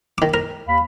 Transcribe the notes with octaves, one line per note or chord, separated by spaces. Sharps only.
D#3 D6
A#4
D#2 F5 B5